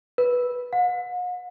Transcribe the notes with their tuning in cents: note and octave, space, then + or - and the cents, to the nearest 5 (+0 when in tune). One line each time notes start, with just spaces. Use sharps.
B4 -10
F#5 -45